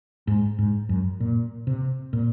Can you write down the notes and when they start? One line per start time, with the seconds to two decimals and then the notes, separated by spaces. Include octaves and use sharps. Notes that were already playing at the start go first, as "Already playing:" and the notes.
0.27 G#2
0.59 G#2
0.89 F#2
1.20 A#2
1.67 C3
2.13 A#2